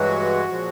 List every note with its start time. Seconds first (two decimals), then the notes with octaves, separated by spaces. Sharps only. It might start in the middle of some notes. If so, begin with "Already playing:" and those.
Already playing: G2 E3 F#3 G#3 F#4
0.48 A#2 F3 G#3